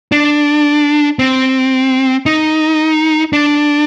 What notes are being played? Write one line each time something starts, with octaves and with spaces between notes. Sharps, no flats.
D4
C4
D#4
D4